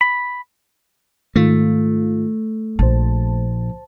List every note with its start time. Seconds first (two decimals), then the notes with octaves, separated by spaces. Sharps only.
0.01 B5
1.36 G#2 D#3 A3 F4
2.79 A#1 C5 A5